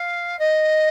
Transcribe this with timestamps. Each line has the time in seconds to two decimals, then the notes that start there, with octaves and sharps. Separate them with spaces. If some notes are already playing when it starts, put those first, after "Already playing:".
Already playing: F5
0.39 D#5